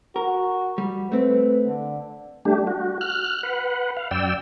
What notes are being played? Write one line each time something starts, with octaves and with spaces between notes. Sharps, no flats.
F#4 A#4
G3
A3 C4 B4
D3
G3 A3 D4 G4
F#4
F6 F#6
B4 F#5
F5
F#2 D5 G5 E6